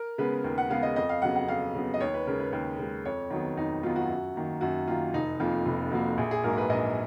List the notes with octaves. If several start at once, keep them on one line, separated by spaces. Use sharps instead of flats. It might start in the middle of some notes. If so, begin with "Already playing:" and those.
Already playing: A#4
C#3 G#3 B3 B4
D#2 A#4
F#5
C#3 G#3 B3 F5
D#5
F2 D#5
F5
C#3 F#3 B3 F#5
F#5
F2 F5
C#3 F#3 B3
D#5
D#2 C#5
B4
C#3 G#3 A#4
B4
D#2
C#3 G#3
F2 C#5
D#3 F#3 B3
F2 D#4
D#3 F#3 B3 F4
F#4
F#2
D#3 A#3
F#2 F#4
D#3 A#3 F4
F1 D#4
F2 F3 A#3 F4
F1 F4
F2 F3 A#3 F#4
A#1 G#4
G#4
G#2 F#3 A#3 A#4
B4
A#1 D#5